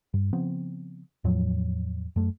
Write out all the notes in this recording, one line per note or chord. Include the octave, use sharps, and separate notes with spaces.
G2
C#3 F3 B3 C4
E2 A2 F3 F#3
F#2 A3